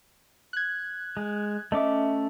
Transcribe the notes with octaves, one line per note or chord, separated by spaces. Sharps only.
F#6 G#6
G#3
A3 C#4 D#5 E5 D6